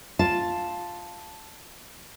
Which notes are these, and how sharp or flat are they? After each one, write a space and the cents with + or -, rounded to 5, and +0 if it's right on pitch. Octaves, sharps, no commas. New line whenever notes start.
F4 +0 A5 +0